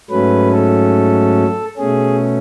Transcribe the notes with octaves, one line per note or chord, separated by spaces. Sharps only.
G#2 F#3 A3 C#4 B4
A4
B2 A3 C#4 G#4